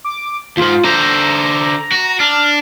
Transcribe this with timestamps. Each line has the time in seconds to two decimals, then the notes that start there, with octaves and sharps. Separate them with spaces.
0.04 D6
0.57 D#2 G#2 F4
0.84 D3 C5 A#5
1.92 F#4
2.20 D4 F6